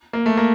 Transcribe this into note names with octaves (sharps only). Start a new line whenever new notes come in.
A#3
A3
A#3